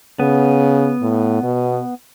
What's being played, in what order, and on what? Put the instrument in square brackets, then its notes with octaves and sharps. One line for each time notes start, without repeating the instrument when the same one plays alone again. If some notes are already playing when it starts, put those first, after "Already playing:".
[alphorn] C#3 [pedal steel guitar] B3
[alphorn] A2
B2